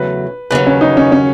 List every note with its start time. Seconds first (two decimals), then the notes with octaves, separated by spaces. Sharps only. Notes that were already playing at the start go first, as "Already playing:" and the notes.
Already playing: E2 C#3 F#3 A3 B4
0.51 D#2 C#3 F#3 B4
0.67 C#4
0.81 D#4
0.97 C#4
1.12 C#4